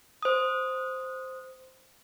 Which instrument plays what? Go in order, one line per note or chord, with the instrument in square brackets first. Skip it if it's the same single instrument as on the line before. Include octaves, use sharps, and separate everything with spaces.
[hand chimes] C5 D#6